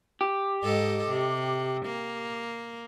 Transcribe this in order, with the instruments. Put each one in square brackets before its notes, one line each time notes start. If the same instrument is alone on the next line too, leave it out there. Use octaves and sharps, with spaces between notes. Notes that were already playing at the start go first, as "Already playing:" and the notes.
[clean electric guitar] G4
[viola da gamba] G#2 A4 D#5
C3
A#3